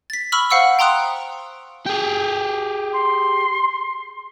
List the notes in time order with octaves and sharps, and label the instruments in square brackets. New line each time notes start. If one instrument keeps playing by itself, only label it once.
[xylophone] A6 B6
B5 C#6 E6 F6 F#7
C5 F5 F#5 C#6 E6
G5 A#5 C6 D#6 F#6
[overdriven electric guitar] G4 G#4
[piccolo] C6